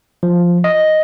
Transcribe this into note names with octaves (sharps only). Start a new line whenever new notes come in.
F3
D#5